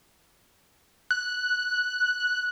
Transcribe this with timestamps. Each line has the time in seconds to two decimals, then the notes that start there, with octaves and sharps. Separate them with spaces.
1.11 F#6